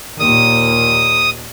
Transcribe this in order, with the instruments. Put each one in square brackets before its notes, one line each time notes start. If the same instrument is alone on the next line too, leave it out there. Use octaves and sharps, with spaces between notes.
[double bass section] D#2 A#2 [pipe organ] D#6